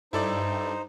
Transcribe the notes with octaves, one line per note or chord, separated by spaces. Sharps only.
G2 D#4 E4 A4 C5 D5